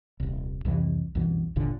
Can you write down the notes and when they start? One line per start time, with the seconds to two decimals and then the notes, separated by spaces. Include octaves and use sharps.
0.20 D#1 C2
0.65 C2 F2 C3 E3
1.15 C2 F#2 B2 E3
1.56 G1 D#2 A#2 D3